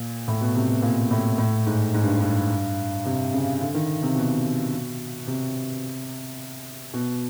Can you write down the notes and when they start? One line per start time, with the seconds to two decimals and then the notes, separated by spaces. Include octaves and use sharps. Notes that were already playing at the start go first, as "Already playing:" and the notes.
Already playing: A#2
0.28 A2
0.41 B2
0.56 C3
0.69 B2
0.82 A#2
1.11 A2
1.38 A2
1.66 G#2
1.94 G#2
2.03 G2
2.20 G2
3.05 C3
3.33 C#3
3.61 D3
3.74 D#3
4.03 C3
4.16 B2
5.27 C3
6.93 B2